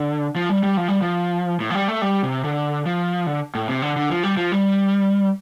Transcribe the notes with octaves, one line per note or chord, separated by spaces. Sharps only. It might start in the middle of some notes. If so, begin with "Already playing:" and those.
Already playing: D3
F3
G3
G3
F3
G3
F3
A2
F3
G3
A3
G3
C3
D3
F3
D3
A2
C3
D3
D3
F3
G3
F3
G3